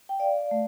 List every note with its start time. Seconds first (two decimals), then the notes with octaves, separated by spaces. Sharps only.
0.09 G5
0.20 D5 F5
0.51 A3